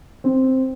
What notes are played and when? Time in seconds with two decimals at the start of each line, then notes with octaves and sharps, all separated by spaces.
0.24 C4